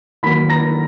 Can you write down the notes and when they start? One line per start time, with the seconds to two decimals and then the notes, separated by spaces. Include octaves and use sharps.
0.23 D#3 F#3 A#3 B5 B6
0.49 A#5 A#6